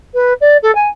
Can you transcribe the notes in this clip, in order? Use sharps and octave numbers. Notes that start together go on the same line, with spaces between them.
B4
D5
A4
G#5